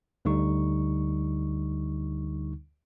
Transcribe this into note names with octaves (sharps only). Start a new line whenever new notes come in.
D2 D3 G3 D#4 C#6